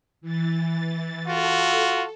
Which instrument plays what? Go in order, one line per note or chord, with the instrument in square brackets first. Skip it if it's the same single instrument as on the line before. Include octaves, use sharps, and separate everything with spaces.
[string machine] E3 A6
[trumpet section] F4 F#4 [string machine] A4